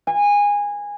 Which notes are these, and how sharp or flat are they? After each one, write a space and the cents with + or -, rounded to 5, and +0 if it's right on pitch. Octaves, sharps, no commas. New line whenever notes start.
G#5 -20